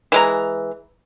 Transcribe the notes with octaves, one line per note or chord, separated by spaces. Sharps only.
E3 G#3 A#5